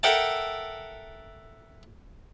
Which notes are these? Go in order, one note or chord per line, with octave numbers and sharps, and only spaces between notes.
A4 A#4 E5 F#5 G5 A5